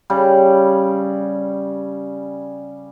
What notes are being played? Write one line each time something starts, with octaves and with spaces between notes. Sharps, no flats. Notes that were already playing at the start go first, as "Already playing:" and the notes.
C#3 G3